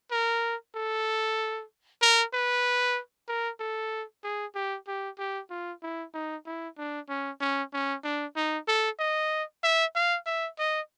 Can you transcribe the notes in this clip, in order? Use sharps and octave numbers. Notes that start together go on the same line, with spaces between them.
A#4
A4
A#4
B4
A#4
A4
G#4
G4
G4
G4
F4
E4
D#4
E4
D4
C#4
C#4
C#4
D4
D#4
A4
D#5
E5
F5
E5
D#5